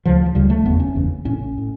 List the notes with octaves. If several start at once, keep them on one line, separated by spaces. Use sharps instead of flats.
D2 C#3 F3
F3
D2 C#3 G3
A3
F#1 E2 C#3 B3
C#4
F#1 E2 C#3
A#1 A2 C#4
A2